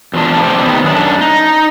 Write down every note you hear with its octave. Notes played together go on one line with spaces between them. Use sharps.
E2 F3 D4
C3 A3 C4 G4 D5
D#3 B3
F#2 D4
D#4